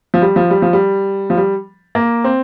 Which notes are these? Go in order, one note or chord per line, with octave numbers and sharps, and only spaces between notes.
F3
G3
F3
G3
F3
G3
F3
G3
A#3
C4